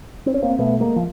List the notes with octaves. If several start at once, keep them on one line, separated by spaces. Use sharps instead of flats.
C4
C#4
A#3 C4
B2 A3 B3
G#3 A#3
F3